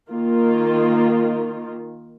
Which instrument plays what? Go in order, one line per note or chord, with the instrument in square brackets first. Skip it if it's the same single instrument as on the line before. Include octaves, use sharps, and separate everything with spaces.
[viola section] D#3 A#3 F4